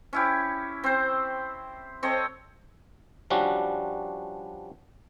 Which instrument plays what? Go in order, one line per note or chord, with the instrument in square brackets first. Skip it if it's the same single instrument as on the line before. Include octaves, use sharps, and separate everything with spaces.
[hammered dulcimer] C#4 E4 G4
C4 C5
C4 A4 C#5 D#5
[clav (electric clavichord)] F3 G3 C#4 D4 F#4